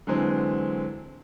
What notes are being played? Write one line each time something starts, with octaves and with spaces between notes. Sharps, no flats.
D3 E3 F#3 G#3 C4